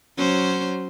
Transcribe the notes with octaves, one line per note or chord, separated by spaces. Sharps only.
F#3 C#4 C5